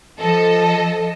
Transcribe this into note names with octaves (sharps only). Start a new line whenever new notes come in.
F3 A4 D#5